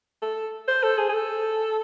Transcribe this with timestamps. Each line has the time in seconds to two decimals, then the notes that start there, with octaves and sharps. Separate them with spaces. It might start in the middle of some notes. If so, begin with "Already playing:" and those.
0.22 A4
0.68 C5
0.83 A4
0.98 G#4
1.09 G#4
1.14 A4